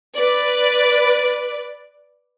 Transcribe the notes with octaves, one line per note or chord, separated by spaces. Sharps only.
B4 D5